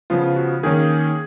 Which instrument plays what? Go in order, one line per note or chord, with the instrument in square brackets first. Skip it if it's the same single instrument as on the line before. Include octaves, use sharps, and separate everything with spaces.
[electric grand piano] C#3 F3 B3 F4
F#4
D#3 A#3 C#4 G#4